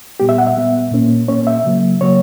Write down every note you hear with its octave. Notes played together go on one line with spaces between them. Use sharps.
A#2 G3 B3 G4
E5
F#5
E5
A#2 G3 B3
A#2 A#3 C#4
A#2 A#3 C#4 C#5
E5
C#3 F#3 A#3
C#3 F#3 A#3 C#5